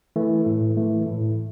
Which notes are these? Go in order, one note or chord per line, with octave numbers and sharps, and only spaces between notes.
E3 A3
A2
E3 A3
A2